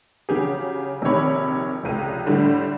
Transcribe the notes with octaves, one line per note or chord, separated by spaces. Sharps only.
C#3 F#3 G4 G#4
A#1 C3 D#3 G4 C#5 B5
F1 C#2 D#7
A2 D3 G3 D4